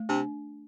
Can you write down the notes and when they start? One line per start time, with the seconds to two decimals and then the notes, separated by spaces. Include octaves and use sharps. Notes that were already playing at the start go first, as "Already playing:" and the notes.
Already playing: A3
0.09 C3 D4